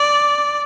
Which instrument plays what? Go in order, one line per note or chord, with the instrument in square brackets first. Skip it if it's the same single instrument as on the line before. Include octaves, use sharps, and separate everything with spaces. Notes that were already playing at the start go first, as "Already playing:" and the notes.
Already playing: [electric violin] D5